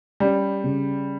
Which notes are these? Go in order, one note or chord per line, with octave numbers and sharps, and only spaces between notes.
G3 C#4
C#3